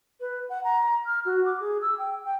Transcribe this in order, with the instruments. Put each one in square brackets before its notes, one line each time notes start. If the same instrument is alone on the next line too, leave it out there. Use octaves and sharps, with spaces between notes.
[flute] B4
F#5
A#5
F6
F#4
D6
G#4
E6
G5
G5